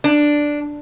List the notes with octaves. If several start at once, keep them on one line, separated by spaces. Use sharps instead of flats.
D4